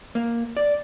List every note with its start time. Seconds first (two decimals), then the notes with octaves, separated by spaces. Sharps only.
0.15 A#3
0.57 D5